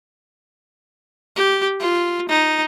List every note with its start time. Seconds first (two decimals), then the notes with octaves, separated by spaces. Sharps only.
1.36 G4
1.80 F4
2.29 D#4